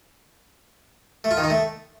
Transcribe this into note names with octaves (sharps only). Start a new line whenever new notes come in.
A3
F4
D#3
D#4
A3